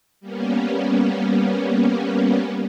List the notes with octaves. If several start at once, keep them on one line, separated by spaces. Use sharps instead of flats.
G3 A#3 B3 C#4